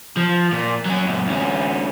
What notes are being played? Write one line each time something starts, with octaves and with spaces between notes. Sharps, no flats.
F3
A#2
F#3 C#4
F#2 A#2
D2 C#4